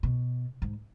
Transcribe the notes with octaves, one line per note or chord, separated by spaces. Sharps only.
B2
G#2